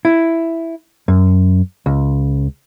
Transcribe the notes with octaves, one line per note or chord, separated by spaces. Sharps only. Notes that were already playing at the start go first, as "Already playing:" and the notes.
E4
F#2
C#2